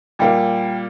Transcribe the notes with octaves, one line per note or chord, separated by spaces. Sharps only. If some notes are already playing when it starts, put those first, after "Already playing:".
A#2 G3 A#3 G5